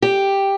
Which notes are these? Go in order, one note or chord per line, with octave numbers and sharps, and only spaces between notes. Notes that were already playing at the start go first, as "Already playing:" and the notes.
G4